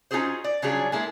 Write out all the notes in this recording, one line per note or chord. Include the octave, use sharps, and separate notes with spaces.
C#4 D#4 F4 F#4 G#4 C5
D5
C#3 F#3 G3 D4 F4 G#4
G#3 A#3 E4 A4